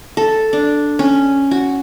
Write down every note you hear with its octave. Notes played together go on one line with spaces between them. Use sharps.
A4
D4
C#4
F#4